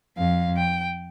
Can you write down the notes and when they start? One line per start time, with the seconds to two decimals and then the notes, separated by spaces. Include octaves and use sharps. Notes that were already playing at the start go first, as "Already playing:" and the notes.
0.17 F2 F5
0.57 G5